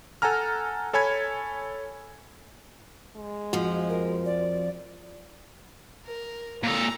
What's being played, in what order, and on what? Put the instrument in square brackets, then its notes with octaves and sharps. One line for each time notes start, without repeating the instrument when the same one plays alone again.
[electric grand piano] A4 F#5 G#5 A#5 F6
A4 C#5 G#5 B5 G#6
[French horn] G#3
[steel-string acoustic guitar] F2 F3 [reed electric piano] F#4
[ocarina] A#4
D5
[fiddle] A#4
[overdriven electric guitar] A#2 A4 [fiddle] A#5